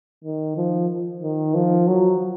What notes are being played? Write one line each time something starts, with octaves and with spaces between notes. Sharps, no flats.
D#3
F3
D#3
F3
F#3